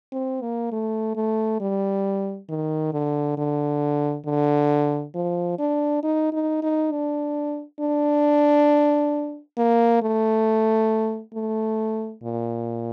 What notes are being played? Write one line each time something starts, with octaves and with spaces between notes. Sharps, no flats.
C4
A#3
A3
A3
G3
D#3
D3
D3
D3
F3
D4
D#4
D#4
D#4
D4
D4
A#3
A3
A3
A#2